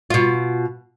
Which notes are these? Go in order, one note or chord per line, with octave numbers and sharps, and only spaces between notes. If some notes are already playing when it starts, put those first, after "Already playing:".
B2 F4